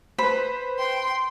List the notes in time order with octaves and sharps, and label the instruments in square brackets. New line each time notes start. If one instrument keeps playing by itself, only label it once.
[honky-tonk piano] B4 C5 [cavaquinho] B5
[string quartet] G5 C6